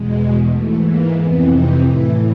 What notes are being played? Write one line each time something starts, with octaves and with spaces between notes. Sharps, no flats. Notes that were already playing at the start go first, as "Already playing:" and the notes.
Already playing: E2 B2 G#3
G#2 E3 A3
A#3
F2 C3 E3 B3
D#4
A2 E3 E4